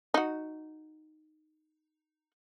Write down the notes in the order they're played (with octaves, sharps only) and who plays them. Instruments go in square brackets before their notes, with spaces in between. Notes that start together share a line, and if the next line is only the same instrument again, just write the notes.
[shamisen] D#4 F#4